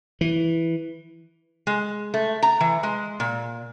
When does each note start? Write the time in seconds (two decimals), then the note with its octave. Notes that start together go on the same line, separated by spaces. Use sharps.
0.21 E3
1.67 G#3
2.14 A3
2.43 A#5
2.61 E3
2.83 G#3
3.20 A#2